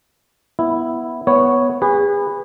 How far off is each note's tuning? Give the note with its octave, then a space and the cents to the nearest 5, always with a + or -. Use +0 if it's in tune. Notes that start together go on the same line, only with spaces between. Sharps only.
B3 -5 E4 +0
B3 +0 C#5 +0
G#4 -35 B4 +0